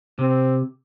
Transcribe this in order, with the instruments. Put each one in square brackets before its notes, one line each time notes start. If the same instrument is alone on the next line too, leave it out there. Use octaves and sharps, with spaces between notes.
[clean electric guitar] C3 [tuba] C4